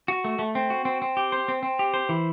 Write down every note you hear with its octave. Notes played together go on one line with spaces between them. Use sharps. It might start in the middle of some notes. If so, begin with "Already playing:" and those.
F#4
A3
A3
C4
F#4
C4
C4
G4
C5
C4
C4
G4
C5
E3